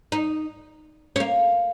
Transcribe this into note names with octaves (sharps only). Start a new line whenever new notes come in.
D#4
C#4
A#3